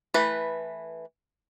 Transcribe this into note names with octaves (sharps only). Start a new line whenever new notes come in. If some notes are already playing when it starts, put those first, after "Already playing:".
E3 A3 B4